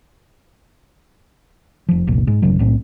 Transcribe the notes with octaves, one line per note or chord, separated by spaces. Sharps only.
F1 F3
F1 C2 A#2
G#2
G#1 F#2 C#3 F#3
B1 A2 C4